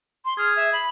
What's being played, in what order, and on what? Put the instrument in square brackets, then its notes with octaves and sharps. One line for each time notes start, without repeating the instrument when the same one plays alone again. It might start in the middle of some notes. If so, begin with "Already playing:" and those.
[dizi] C6
[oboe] G#4 [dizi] F6
[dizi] E5
B5